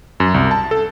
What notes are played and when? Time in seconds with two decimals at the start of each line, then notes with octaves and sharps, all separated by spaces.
0.20 F#2
0.34 C2
0.51 A5
0.71 A4